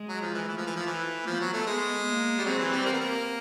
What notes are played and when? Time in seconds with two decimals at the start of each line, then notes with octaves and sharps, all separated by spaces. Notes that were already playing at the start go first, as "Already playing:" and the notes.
Already playing: G#3
0.09 F#3
0.21 F3
0.34 E3
0.48 E3 A3
0.57 F3
0.67 E3
0.76 F3
0.86 E3
1.26 F3 B3
1.40 F#3
1.53 A3
1.66 G#3
2.06 A#3
2.38 G3
2.45 F#3 C4
2.58 E3
2.72 G3
2.86 A#3
2.92 B3
3.00 A#3